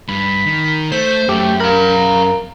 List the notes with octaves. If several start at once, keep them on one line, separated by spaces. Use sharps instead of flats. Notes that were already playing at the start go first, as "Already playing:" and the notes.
G2 B5
D#3
A3 C5 B6
F#2 A3 G4
A#4 F5 B5